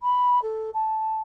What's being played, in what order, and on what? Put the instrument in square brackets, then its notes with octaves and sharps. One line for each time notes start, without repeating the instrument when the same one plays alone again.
[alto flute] B5
A4
A5